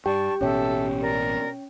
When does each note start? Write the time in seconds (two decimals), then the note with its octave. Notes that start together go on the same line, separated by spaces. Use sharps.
0.06 G2 G4 D5 G5 A5 C#6
0.41 A1 B2 C#4 A4 C#5 E5 G5
1.00 A#4 D5